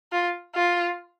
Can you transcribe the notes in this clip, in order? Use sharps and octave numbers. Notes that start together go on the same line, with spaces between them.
F4
F4